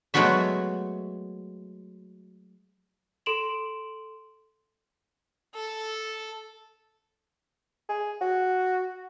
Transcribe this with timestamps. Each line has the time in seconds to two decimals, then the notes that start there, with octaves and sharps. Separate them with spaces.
0.14 F#3 G#3 A3 B3 F#4 E5
3.26 A4 C6 D7 E7 F#7
5.55 A4
7.89 G#4
8.21 F#4